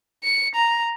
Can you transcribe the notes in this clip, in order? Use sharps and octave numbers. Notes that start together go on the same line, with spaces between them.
C#7
A#5